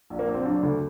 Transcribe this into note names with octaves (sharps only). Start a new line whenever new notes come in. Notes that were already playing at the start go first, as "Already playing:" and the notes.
A#1
A#3
A#1
C4
F#3 D4
D2